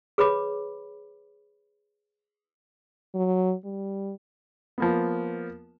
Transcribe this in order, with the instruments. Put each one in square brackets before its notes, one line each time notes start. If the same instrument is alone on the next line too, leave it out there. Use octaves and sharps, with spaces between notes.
[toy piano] G#4 B4 C#5 B5 D6
[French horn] F#3
G3
[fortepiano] F3 A#3 B3